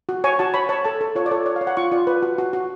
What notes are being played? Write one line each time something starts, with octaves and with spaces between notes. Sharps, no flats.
F#4
C#5 G#5
F#4 A5
C#5 B5
C#5 A5
A4 A5
A4
F4 C#5
D5
A4 C#5
C#5 D5
F5
C#5
F#5
F4 C#6
F4 D5
B4
F#4
F#4
F#4